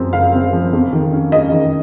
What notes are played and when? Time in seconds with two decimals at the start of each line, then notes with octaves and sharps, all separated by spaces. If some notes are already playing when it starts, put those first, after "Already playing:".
Already playing: F#2 F3 C4
0.13 F#1 F5
0.33 C4
0.53 F3
0.73 F2
0.93 D#3
1.13 C#4
1.32 C#4 D#5
1.52 D#3